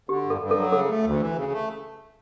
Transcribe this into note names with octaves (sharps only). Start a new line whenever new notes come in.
D3 G4
G2 A4
G2
A4
F#3
C#3 A4
A3
D2
E3
C#3
A3